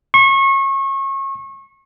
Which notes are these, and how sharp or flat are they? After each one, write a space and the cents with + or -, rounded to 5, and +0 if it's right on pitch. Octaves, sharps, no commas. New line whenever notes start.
C#6 -30